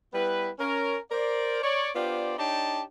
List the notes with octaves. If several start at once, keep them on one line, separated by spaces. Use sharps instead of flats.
G3 B3 E4 B4
C#4 A#4
A#4 C5 D5
C#5 D5
B3 D4 F4 G4 C5 D5
D4 D#4 G4 C#5 G5 A5